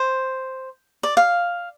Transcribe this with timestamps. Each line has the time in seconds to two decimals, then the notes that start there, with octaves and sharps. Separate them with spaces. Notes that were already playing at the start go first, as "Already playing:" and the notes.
Already playing: C5
1.03 D5
1.17 F5